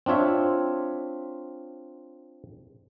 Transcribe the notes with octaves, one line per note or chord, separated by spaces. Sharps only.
C4 D4 F4 C#5 E5